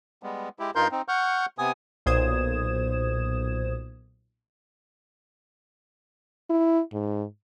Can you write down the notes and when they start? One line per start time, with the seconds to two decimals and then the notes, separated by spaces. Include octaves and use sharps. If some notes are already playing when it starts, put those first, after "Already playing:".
0.23 G3 G#3 B3
0.59 G#3 E4 G4
0.76 G2 D#4 F4 A#4 C6 G6
0.91 C4 D#4
1.08 F#5 C#6 F6 G6
1.58 C3 B3 G#5 D#6
2.06 B1 A#2 C5 D#6 G#6 E7
6.50 E4
6.93 G#2